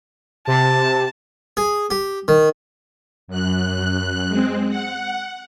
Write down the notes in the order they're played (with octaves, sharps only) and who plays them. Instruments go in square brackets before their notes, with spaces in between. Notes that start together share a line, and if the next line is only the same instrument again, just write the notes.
[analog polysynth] C3 [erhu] A5
[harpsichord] G#4
G4
D#3
[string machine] F#2 F#6
G#3 C4
F#5